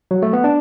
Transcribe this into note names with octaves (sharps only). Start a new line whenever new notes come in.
F#3
A3
B3
D4